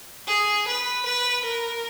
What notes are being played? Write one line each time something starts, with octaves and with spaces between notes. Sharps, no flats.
G#4
B4
B4
A#4